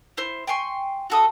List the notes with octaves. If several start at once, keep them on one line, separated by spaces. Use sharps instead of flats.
E4 C5
G5 G#5 C6 C#6
F#4 A4 D#6